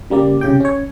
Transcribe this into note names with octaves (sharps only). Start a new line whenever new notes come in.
C#3 G3 A#3 D5
C2 C#3 G4 G5
C#4 C#5